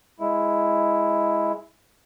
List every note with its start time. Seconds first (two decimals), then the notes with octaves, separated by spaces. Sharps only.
0.20 G#3 E4